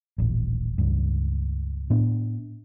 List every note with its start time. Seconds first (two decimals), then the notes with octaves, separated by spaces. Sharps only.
0.18 D#1 A1
0.78 C#2 G2
1.90 A2 B3 D4